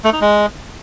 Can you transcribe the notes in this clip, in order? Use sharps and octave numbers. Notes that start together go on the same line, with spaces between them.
A3
D#4
G#3